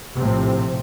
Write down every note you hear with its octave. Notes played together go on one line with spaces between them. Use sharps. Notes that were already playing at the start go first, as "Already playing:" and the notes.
A#1 A2 C3 F3 C4